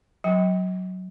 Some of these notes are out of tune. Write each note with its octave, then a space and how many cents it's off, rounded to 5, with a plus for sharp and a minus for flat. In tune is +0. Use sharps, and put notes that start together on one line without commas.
F#3 +0 G5 +5